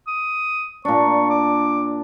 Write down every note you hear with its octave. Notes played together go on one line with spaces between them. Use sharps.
D#6
A#2 D4 C#6
D6